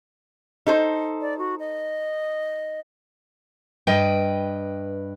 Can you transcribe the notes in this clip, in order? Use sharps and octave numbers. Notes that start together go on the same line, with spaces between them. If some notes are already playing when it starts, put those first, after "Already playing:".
D#4 A4 C5
D5
F#4
D#5
G2 B4 D#5 G5